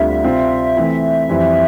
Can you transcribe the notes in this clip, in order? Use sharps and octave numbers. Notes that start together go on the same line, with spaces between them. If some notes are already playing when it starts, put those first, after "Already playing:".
Already playing: D2 D3 G3 C4 F4 E5
C3 G3 C4 F4
E3 A3 C4 E4
F2 E3 G3 C4 E4